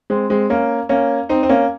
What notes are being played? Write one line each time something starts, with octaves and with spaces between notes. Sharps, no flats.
G#3 C4
G#3 C4
A#3 C#4
A#3 C#4
C4 D#4
C4
A#3 C#4